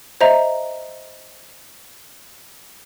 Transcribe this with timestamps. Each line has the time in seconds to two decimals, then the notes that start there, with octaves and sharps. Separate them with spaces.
0.21 C5 D#5 E5 A#5